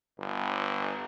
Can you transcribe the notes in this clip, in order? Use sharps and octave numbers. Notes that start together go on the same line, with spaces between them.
G1